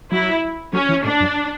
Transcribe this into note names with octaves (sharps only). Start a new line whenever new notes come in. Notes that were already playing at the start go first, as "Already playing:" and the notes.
F#3 E4
F#3 C#4
E3
A2 D4
F#2